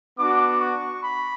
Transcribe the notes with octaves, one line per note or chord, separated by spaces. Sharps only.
B3 D4 F#4 D6
C#6
B5